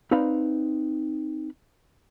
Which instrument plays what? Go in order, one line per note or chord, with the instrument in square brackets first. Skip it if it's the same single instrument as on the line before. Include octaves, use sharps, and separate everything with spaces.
[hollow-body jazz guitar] C4 D#4 B4 D5 F5 B5